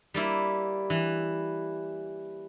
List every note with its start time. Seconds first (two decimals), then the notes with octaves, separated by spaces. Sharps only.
0.14 G3 A#3 E4
0.90 E3